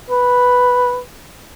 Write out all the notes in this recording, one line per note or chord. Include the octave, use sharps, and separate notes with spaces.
B4